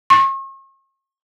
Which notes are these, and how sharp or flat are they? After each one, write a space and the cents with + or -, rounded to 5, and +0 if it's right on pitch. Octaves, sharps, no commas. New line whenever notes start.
C#6 -40